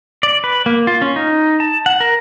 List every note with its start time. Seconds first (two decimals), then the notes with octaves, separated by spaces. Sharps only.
0.23 D5
0.44 B4
0.66 A#3
0.87 F4
1.02 C#4
1.16 D#4
1.60 A5
1.86 F#5
2.00 A#4